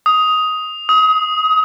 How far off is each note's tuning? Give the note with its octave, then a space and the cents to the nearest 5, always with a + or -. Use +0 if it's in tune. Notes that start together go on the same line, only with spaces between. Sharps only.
D#6 +10
D#6 +30